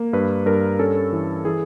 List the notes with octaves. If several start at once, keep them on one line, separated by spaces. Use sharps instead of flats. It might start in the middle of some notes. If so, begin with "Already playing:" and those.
Already playing: A#3
G2 B4
G2 A#4
C#4 A4
E3
E3 G#4